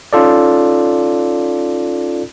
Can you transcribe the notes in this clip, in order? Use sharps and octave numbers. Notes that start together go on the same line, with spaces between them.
C#4 D#4 F4 A4 D5